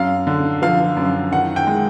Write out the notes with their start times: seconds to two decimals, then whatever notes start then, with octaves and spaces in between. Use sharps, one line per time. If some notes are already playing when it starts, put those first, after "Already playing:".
Already playing: F#2 F5
0.27 D3
0.62 F3 F5
0.97 F#2
1.32 D#3 F#5
1.56 G5
1.67 G#3